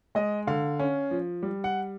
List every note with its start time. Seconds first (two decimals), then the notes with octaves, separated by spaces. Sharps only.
0.15 G#3 D#5
0.47 D3 F5
0.80 C#4
1.11 F3
1.43 G3
1.64 F#5